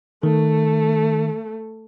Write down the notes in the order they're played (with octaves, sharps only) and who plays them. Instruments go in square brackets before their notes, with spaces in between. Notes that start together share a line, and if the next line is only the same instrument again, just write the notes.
[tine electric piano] D#3 [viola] A3